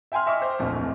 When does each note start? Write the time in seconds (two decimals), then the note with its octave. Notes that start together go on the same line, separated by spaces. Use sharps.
0.12 E5 G5 G#5 C6 F6
0.26 D#5 E5 C#6 D6 F6
0.42 C5
0.59 D1 A#1 F2